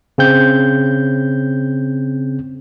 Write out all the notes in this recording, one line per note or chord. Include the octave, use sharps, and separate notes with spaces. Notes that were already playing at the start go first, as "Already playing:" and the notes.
C#3 C4 G6